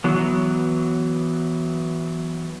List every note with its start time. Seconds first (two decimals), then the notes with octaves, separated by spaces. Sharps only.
0.04 E3 F#3 B3